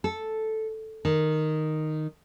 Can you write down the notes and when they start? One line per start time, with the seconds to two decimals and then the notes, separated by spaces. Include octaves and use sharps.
0.04 A4
1.05 D#3